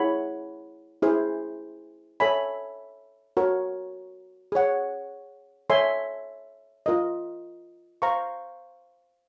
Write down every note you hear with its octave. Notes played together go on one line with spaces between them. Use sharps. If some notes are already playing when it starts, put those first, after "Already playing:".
Already playing: E4 G#4 C#5 F#5 B5
E4 G#4 C5
A4 C#5 E5 G#5 B5
F#4 A#4 C#5
G#4 C#5 F#5
A4 C#5 E5 G#5 C6
F4 A#4 D#5
C5 F5 A#5 C#6